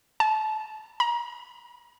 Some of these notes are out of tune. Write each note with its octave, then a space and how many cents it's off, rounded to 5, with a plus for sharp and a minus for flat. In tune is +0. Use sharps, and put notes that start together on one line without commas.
A5 -25
A#5 +30